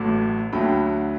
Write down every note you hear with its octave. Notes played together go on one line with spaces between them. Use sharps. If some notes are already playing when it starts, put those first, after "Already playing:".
Already playing: A1 A2 F#3 A3 D6
D2 D3 F#3 G5 B5